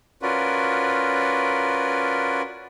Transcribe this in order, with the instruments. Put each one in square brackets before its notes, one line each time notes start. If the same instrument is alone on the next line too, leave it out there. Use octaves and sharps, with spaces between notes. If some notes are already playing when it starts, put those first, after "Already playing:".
[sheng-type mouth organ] C#4 F4 F#4 A#4 B4 D5